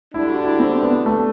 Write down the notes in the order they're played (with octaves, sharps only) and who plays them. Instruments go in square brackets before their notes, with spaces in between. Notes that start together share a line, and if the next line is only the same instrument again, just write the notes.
[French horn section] D3 G3 D4 [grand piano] E4
[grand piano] F#4
E4
C4
B3
A3